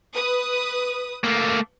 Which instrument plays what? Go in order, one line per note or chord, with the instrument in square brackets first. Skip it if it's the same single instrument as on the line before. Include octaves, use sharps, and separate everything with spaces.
[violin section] B4 D#6
[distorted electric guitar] A3 A#3